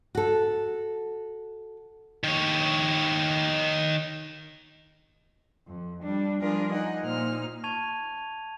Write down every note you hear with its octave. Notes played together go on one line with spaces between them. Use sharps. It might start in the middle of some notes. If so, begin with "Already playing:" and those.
F#4 A4
D#3 C#5
F2
G3 D4
F3 G3 D4 F4 G#4 A#4
D#4 D#5 F#5 G#5
A#2 D#4 C5 F6
A5 C#6 G#6 D#7 F7